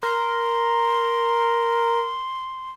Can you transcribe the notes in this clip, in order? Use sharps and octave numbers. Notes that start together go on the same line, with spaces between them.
A#4 C6